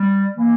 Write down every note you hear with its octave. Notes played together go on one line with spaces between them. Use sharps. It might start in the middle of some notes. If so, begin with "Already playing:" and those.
Already playing: G3
E3 A#3